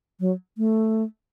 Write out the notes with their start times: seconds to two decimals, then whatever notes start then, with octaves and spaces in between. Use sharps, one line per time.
0.20 F#3
0.58 A3